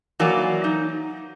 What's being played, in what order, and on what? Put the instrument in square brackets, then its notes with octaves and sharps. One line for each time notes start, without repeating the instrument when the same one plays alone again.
[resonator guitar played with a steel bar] E3 F#3 A#3 D5 G#5
D#4